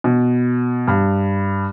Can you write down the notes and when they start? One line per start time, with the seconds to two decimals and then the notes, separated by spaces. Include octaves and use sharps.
0.04 B2
0.88 G2